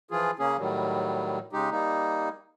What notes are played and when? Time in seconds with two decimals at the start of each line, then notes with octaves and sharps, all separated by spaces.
0.11 E3 F3 F4 G#4
0.39 C#3 A#3 C#4 G#4
0.58 A2 D#3 F#3 G3
1.53 C#3 G#3 D#4 G4
1.71 G3 A#3 D#4